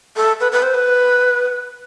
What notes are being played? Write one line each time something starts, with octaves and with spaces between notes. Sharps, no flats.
A4
B4
B4
C5
B4